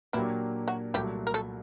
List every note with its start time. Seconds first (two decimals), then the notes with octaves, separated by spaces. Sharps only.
0.13 A#2 E3 F#3 A#3 D4 E4 G4
0.68 F#3 F#4
0.94 C2 A#2 F#3 G3 A3 G4
1.27 A#4
1.34 A3 A4